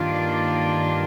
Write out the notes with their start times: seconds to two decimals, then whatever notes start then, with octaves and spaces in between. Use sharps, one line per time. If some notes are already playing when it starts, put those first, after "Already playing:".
Already playing: G2 D#3 A#3 D4 F4
0.10 D5